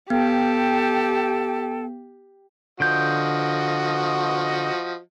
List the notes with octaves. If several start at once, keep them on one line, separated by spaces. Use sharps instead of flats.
B3 G4 A4 G5
D3 F3 F#4 D#5 G6